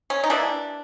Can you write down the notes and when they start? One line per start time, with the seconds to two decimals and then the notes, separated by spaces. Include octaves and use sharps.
0.10 C#4
0.24 D#4
0.30 E3 G3 A#3 D4